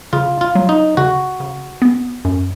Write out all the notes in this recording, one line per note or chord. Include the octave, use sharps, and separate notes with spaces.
C#3 F4
F4
F#3
D#4
C#3 F#4
C#3
B3
F#2